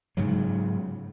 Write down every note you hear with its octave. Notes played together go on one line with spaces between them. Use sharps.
G#2 C#3 F#3